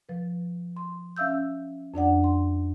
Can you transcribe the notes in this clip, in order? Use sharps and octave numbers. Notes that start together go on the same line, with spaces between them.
F3 B4
C6
C#4 E5 F5 E6 G6
F2 D4 D5 F#5
C6